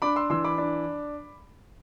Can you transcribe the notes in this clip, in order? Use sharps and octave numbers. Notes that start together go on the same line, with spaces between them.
D4 B5 D6
C6 E6
E3 C6 E6
B5 D6
D4